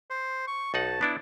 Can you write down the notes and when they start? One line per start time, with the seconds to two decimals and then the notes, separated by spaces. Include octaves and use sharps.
0.10 C5
0.47 C#6
0.74 B1 D#4 F#5 A5
1.01 B3 D4 E4